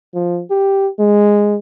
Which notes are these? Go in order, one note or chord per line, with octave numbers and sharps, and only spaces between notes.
F3
G4
G#3